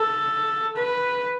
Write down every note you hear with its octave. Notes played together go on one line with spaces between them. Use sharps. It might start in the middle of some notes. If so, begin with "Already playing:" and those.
Already playing: A4
B4